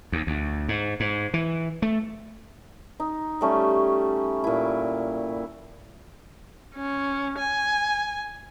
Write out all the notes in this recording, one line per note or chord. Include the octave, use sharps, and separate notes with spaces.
D#2
D2
G#2
G#2
E3
A3
D#4
G3 A3 C#4
A#2 E4
C#4
G#5